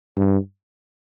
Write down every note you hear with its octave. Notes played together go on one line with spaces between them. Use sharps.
G2